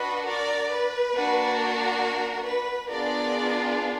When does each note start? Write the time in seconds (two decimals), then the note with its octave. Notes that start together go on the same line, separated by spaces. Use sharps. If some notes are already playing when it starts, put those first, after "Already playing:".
Already playing: D4 F#4 B4 D#5
0.27 A#4 D5
0.71 B4
1.15 A#3 D4 F#4
1.58 A#4
2.45 B4
2.89 B3 D4 F4 G#4 A#4 D5